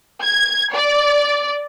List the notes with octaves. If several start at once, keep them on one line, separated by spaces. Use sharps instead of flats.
G#6
D5